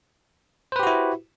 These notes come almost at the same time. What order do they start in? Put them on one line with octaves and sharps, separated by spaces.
C5 B4 G4 F#4 E4